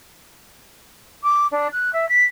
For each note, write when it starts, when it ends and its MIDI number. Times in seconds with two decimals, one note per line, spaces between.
1.23 1.47 86
1.52 1.68 62
1.73 1.90 90
1.93 2.08 76
2.09 2.25 95